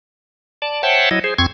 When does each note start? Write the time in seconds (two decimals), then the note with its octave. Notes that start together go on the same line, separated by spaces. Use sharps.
0.62 D5 A5
0.83 C5 C#5 E5 F#5 G5 A5
1.11 F#3 E4 D#5
1.24 G#4 C5
1.38 F2 C4 C#6 G#6